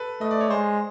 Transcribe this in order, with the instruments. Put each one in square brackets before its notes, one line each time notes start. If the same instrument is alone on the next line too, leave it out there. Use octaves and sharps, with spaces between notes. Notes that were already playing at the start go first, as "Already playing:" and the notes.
Already playing: [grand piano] A4 B4
[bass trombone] A3 [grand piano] D#5
[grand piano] D5
C#5
[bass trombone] G#3 [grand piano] C5